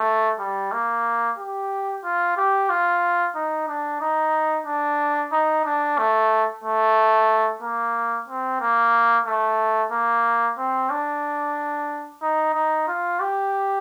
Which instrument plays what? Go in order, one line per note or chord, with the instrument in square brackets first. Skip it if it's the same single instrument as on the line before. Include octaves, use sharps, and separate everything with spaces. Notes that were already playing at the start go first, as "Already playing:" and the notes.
Already playing: [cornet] A3
G3
A#3
G4
F4
G4
F4
D#4
D4
D#4
D4
D#4
D4
A3
A3
A#3
C4
A#3
A3
A#3
C4
D4
D#4
D#4
F4
G4